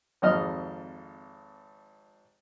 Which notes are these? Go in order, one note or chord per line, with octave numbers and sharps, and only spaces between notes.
G#1 F2 D#5 F6